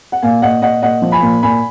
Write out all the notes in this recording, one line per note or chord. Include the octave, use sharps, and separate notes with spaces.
F#5
A#2 F5 G#5
A#2 D#5 F#5
A#2 D#5 F#5
A#2 D#5 F#5
F3
G#5 B5
A#2
A#2 G#5 B5